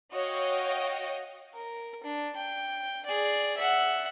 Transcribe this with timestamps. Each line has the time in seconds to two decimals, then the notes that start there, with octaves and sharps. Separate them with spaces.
0.13 F#4 C#5 D#5 F5 G5
1.54 A#4
2.04 D4
2.36 G5
3.06 G#4 D5
3.57 E5 F#5